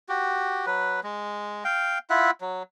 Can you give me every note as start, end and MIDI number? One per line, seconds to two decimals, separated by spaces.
0.09 0.66 66
0.09 0.66 67
0.66 1.00 54
0.66 1.00 71
1.03 1.64 56
1.65 1.98 77
1.65 1.98 79
2.10 2.31 64
2.10 2.31 65
2.10 2.31 76
2.10 2.31 78
2.41 2.63 54